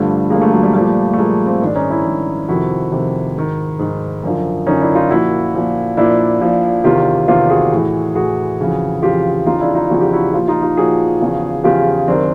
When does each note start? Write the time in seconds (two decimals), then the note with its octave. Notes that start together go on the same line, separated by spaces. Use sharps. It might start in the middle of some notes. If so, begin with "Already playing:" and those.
Already playing: G2 D3 F3 G3 A3
0.30 G2 D3 F3 G#3 A#3
0.41 G3 A3
0.52 F#3 G#3
0.63 G3
0.74 A#2 F3 G3 A3
1.13 A3
1.17 A#2 F3 G#3 A#3
1.46 A#3 C4
1.62 G#2 D#3 D4
1.75 C#4 D#4
1.90 D4 E4
2.05 G#2 D#3
2.48 F2 C3 D#3 E4 F#4
2.92 F2 C3 D#3
3.36 G#2 D#3
3.79 G#2 D#3
4.23 F#2 D3 F3
4.67 F#2 D3 F3 C#4 D#4
4.81 D4 E4
4.95 D#4 F4
5.10 A#2 F3 E4 F#4
5.54 A#2 F3
5.97 A#2 F3 D4 E4
6.41 A#2 F3
6.84 E2 C3 D#3 F4 G4
7.28 E2 C3 D#3 F4 G4
7.50 F#4 G#4
7.72 A2 E3
8.15 A2 E3 F#4 G#4
8.60 F2 C#3 E3
9.02 F2 C#3 E3 F4 G4
9.46 E2 C#3 F3 D#4 F4
9.61 D4 E4
9.75 D#4 F4
9.90 E2 C#3 F3 F#4
10.01 G4
10.13 E4 F#4
10.34 A#2 F3 F4 G4
10.48 D#4 F4
10.62 D#4 F4
10.77 A#2 F3 F#4 G#4
11.21 E2 C#3 F3
11.64 E2 C#3 F3 F4 G4
12.08 F#2 D#3 C4 D4